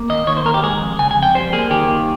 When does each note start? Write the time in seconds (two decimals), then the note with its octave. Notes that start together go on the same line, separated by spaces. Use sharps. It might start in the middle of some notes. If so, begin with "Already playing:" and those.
Already playing: A#3
0.09 D#2 D#5
0.27 D#3 C#5
0.37 C5
0.45 D#2 A#4
0.54 G4
0.63 G#3 G#4
0.81 F2
0.99 C#3 G#5
1.11 G#5
1.17 F2
1.23 G5
1.35 G3 C5
1.53 A#3 G#4
1.71 D#3 G4
1.88 D#2